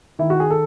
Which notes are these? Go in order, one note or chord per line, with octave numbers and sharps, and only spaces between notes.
D#3 E4
F#4
G#4
A4